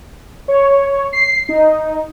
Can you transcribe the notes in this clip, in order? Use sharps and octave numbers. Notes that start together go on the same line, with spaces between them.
C#5
C7
D#4